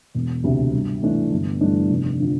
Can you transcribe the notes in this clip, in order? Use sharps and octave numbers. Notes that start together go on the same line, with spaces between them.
E1
D2 C3
G2
E3 A3 D4
G1
G2 E3 A3 D4
F1
D3 F3